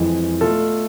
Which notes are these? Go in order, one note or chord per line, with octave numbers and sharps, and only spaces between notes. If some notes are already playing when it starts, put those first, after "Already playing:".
Already playing: F2 E3 G#3
B2 A3 F4 A4